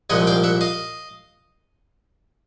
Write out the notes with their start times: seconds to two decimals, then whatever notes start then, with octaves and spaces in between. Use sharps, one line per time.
0.10 C2 A#2 F3 G#3 F#5 G#5
0.27 F5 G5
0.44 E5 F#5
0.61 D#5 F5